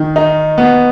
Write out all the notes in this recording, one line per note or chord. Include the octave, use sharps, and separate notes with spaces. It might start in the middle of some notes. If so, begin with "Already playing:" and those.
Already playing: D#3
D#4
B3